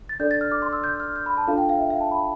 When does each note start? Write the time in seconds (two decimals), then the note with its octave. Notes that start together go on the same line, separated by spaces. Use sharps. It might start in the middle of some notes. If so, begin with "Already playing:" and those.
0.09 A6
0.19 D4 A4 D5 G6
0.31 A6
0.41 F6
0.52 D6
0.62 C6
0.73 E6
0.84 G6
1.00 F6
1.16 G6
1.26 B5
1.37 A5
1.47 D4 F4 A4 F5
1.58 G5
1.69 F5
1.79 E5
1.90 F5
2.01 A5
2.12 B5